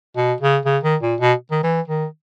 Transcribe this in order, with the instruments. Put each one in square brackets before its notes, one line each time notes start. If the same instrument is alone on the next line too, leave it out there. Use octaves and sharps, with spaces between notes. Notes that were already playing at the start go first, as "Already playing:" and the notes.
[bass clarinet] B2
C#3
C#3
D#3
A#2
B2
D#3
E3
D#3